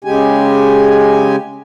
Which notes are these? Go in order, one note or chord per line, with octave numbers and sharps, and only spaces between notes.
C#3 G#3 G4 G#5